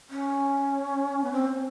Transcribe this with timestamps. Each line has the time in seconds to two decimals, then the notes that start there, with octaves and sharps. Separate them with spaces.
0.10 C#4
1.24 B3
1.32 C4